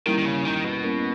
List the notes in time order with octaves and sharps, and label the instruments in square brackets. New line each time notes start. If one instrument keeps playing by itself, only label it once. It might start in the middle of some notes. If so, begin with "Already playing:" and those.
[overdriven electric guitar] D#3 [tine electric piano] G3 A#3 C#4 E4 A#4
[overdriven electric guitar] D#3
C#3
D#3
B2
[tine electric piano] G3 A#3 C#4 E4 A#4